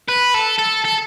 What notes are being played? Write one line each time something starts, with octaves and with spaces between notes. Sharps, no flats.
B4
A4
A4
A4